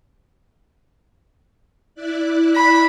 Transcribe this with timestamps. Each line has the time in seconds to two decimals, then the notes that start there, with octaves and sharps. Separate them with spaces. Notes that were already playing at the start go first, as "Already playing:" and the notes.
1.94 E4 D5 F#6
2.56 B5